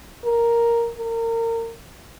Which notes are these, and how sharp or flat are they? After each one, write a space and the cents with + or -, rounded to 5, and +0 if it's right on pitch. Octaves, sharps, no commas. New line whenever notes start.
A#4 +0
A#4 -30